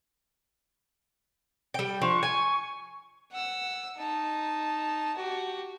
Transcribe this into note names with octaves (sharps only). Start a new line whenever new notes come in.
G3 G5
F3 D4 C#6
G#5
F#5 E6
D#4 A5
F#4 G4